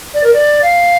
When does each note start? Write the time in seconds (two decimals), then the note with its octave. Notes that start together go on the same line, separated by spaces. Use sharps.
0.14 D5
0.24 A#4
0.34 D5
0.62 F5